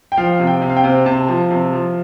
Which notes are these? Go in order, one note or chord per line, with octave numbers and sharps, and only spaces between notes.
G5
F3 F5
C3
G5
C3
F5
G5
C3
C3 A5
F3
C3
F3